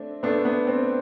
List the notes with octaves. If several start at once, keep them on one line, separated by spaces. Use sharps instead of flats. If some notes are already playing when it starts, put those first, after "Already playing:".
Already playing: A3 C4 D4
A3 B3 D4 A4 C5
B3
C4